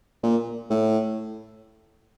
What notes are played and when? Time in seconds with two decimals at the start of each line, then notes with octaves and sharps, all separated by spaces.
0.23 A#2
0.70 A2